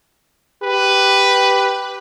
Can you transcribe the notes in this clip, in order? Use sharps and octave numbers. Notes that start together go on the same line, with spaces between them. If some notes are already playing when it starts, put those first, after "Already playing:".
G4 B4